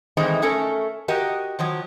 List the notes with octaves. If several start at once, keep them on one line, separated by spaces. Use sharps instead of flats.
D#3 E3 G#3 A3 C4 D#4
A3 C#4 A4 A#4
F#4 G4 A#4 D#5
D#3 F3 F#3